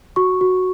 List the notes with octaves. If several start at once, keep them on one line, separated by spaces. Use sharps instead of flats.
F#4 C#6
F#4